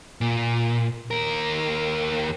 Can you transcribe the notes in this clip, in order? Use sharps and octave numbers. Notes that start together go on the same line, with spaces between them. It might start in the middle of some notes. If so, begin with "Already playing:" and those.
A#2
D#2 A#4